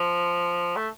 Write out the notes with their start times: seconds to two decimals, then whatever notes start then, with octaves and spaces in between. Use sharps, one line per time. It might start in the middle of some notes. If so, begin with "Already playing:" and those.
Already playing: F3
0.76 A3